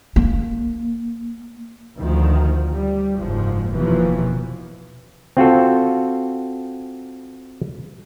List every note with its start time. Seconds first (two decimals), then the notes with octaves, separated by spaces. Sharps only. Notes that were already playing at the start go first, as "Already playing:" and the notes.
0.16 A#3
1.98 D2 D#3 F3
2.72 G3
3.18 F#1 G#2 F3
3.70 F1 D#2 B2 E3 F3
5.37 C4 F4 F#4 A4